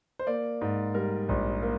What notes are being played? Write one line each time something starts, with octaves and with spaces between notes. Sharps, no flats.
C5
A#3 D5
G#2
G3 A#4
A#1
A#3